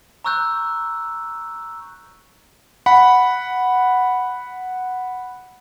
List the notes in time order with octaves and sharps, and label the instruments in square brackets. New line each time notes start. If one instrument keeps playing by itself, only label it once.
[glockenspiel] A#5 C#6 E6 F#6 G6
[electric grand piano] F#5 B5